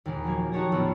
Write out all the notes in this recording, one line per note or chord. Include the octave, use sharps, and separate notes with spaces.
D#2 A#2 E3 G#3
F3 F#3 A#3 G#6
D#4 F#4 G4 C#5 A5 A#5
D#1 A1 B3 F4 F#4 E6